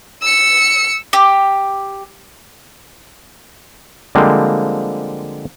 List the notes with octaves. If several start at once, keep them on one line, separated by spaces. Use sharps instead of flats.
E6 C#7
G4
D3 F3 G3 G#3 A#3 C4